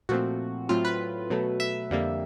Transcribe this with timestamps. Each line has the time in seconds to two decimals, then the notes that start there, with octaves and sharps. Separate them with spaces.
0.09 A#2 F3 A3 C4 F#4
0.69 A2 F#3 A3 C4 F4
0.85 B4
1.30 B2 F#3 A3
1.60 E5
1.91 F2 D3 G3 A#3